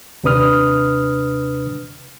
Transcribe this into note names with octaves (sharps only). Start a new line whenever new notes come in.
D#2 C3 D4 B4 D#6 F6